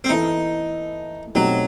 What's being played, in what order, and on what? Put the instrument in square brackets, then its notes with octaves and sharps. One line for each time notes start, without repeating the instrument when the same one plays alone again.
[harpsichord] C4
[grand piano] E3 B3 E4 A4 [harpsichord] D#4
[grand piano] B2 A3 C4 D#4 G4 [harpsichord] F#3